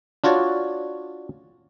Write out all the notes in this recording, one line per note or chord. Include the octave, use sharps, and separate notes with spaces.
D4 F4 F#4 C#5 D5